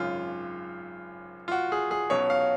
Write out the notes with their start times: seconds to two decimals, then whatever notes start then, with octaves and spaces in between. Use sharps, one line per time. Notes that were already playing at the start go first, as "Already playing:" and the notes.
Already playing: G#1 F#2 C#3 F4
1.48 F4
1.52 F#4
1.72 G#4
1.91 G#4
2.10 B1 B2 F#3 C#4 C#5
2.30 F5